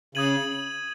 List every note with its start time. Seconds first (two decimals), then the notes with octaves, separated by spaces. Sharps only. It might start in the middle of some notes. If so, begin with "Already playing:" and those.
0.15 C#3 D#6 G#6 D#7 F#7